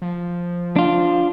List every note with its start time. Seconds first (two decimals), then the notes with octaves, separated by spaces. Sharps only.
0.02 F3
0.76 D4 F4